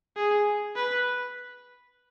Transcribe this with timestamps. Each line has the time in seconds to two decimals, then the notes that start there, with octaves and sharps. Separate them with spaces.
0.16 G#4
0.76 B4